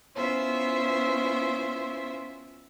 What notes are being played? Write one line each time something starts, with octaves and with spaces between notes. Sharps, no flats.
B3 C#4 E4 F4 C5 E5